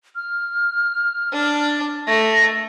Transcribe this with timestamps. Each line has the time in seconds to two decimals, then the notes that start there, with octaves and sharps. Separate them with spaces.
0.16 F6
1.32 D4
2.07 A3 A#6